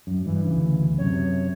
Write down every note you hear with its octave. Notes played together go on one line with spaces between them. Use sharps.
F#2
G2 E3
D2 C#3
F#2 C3 C#5